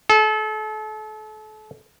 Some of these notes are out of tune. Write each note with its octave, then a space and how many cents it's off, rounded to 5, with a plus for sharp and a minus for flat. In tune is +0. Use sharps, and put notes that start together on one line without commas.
A4 -35